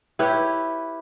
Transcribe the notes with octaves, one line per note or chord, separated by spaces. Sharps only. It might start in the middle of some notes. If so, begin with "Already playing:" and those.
E4 G4 B4 C#5